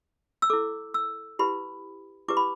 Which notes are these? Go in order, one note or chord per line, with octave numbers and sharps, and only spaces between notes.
E6
E4 A4 D6
E6
E4 G4 B4 B5
E4 G4 B4 D6
B5